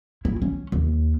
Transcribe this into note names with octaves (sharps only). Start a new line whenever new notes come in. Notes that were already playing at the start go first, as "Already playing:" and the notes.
E4
C#4
D#2